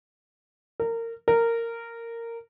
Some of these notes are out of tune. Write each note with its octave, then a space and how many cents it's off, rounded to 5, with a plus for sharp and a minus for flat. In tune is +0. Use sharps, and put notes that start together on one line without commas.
A#4 -25
A#4 -15